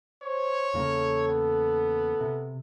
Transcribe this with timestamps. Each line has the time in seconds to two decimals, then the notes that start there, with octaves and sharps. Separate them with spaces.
0.22 C5 C#5
0.74 E2 C#3 A#3 A4
1.29 B3
2.21 C3